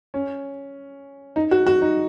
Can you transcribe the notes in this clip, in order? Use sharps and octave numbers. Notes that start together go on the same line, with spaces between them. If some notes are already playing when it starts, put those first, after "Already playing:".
C#4
D#4
F#4
F#4
D#4